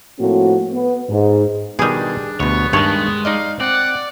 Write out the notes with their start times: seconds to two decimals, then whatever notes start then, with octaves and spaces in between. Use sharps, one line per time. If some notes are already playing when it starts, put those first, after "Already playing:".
0.19 A2 F3 A#3 C4 F#4
0.72 B3
1.10 G#2
1.79 B2 D#3 G3 D4 G#4
2.40 D2 B2 B3 C#5
2.73 G2 D#3 G#3 C#5 A5
3.25 D#4 D5 D#5 F5
3.60 C4 D5 F#5